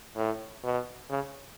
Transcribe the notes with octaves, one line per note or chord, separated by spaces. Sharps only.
A2
B2
C#3